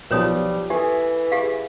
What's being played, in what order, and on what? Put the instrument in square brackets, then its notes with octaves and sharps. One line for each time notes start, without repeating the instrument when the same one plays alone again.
[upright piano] B1 F3 [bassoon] G3 [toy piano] B4 C#5 D#6
[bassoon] E3 [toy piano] G4 A4 [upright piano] G#5
[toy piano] G4 G#4 F5